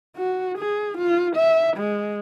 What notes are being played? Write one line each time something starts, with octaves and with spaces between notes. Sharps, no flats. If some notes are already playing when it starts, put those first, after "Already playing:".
F#4
G#4
F4
E5
G#3